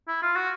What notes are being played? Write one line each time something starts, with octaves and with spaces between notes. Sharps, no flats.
E4
F4
F#4